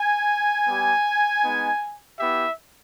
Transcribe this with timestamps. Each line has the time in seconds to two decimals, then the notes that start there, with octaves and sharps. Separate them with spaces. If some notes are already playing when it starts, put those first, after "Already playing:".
Already playing: G#5
0.66 G3 B3 G4
1.43 G#3 B3 D#4
2.19 B3 E4 G4 E5